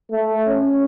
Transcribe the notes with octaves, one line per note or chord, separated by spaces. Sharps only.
A3
C#4